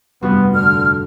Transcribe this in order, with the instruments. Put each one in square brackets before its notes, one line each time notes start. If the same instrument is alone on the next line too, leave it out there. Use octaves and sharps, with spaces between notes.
[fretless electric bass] F1 G2 [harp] G3 F4 F#4 [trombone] B3
[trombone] D3 [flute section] F6